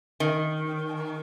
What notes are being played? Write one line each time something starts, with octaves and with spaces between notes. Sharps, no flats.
D#3